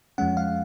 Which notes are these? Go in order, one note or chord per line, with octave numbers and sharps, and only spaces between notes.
F2 F3 G#3 C#4 F#5
F5